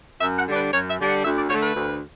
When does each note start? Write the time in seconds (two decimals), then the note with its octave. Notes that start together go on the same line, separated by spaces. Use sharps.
0.21 F#2 E5
0.39 F#5
0.47 D3 G3 D4
0.56 B4
0.73 F#2 C#5
0.90 E5
0.99 D3 G3 D4
1.08 F#5
1.25 D2 E5
1.38 D5
1.50 D3 A3 C#5
1.63 B4
1.75 D2